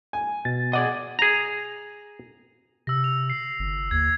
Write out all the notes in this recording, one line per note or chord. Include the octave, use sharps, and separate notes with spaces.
G#5
B2 A6
G#4 D5 D#5 F#5 D6
G#4 A#5
C3 E6 A#6
F7
C7
G1
D#2 G#6